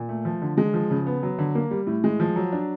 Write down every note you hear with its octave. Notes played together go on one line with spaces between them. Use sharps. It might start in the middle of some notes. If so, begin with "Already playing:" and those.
Already playing: A#2
A3
F3
D3
G#3
F3
C#3
B3
F#3
D3
A#3
G3
A2
G#3
F3
F#3
D4